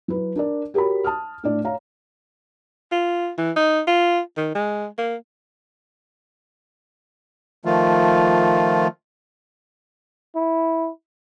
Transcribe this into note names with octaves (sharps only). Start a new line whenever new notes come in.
F#3 E4 B4
D4 A#4 D5
F#4 G4 A#4 C#5 B5
A5 D#6 F6
A2 D4 D5
C#5 F5 A#5
F4
E3
D#4
F4
D#3
G#3
A#3
D#3 F3 A3 F4
E4